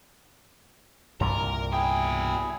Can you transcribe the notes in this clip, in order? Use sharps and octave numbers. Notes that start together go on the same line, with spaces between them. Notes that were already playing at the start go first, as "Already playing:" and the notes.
C2 G2 A#2 A#4
B2 E4 G#4 G5